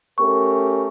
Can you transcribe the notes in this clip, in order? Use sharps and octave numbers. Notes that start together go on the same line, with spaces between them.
A3 C#4 G4 A#4 C#6